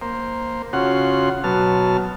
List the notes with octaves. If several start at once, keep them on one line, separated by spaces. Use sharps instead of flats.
A#3 C5
C#3 F4 F#4 F#5 C6
B2 F#3 A5 F6